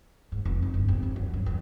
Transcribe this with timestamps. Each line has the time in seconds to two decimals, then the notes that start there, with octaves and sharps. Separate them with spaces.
0.32 G#2
0.45 F1
0.62 D#4
0.74 G1
0.88 C3
1.03 D#2
1.16 F#2
1.34 G2
1.46 E2